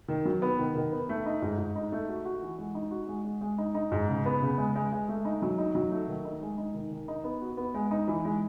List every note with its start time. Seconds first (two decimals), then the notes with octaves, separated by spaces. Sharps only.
0.08 D#3
0.25 F#3
0.42 B3
0.59 D#3
0.75 D#3
0.92 B3
1.09 A3
1.26 D#4
1.42 G#2
1.58 G#2
1.76 D#4
1.92 A3
2.09 F#4
2.25 F#4
2.42 E3
2.58 G#3
2.75 D#4
2.91 F#4
3.08 G#3
3.25 G#3
3.41 G#3
3.58 D#4
3.75 D#4
3.92 G#2
4.09 C#3
4.26 B3
4.42 C#3
4.58 G#3
4.75 G#3
4.92 G#3
5.09 A3
5.25 D#4
5.42 F#3
5.58 D#4
5.75 F#3
5.91 A3
6.08 D#3
6.25 D#4
6.42 G#3
6.58 D#4
6.74 D#3
6.91 D#3
7.08 D#4
7.24 B3
7.42 F#4
7.57 B3
7.74 G#3
7.91 D#4
8.08 E3
8.25 G#3